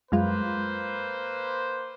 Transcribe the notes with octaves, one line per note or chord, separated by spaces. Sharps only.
F#2 G#3 A#3 F4 B4 C5